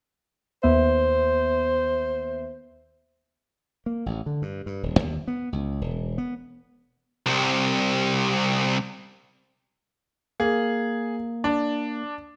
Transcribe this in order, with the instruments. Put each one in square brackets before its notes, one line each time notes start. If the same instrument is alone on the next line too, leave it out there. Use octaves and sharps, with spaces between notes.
[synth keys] D#2 B3 E5 [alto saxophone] C5
[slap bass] A#3
A1
D3
G2
G2
D#1
D#2
B3
C#2
E1
B3
[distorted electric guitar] C2 C3
[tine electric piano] A#3 [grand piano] G#4
[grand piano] D4